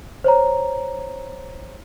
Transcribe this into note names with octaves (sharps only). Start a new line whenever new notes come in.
C5 C#5 A#5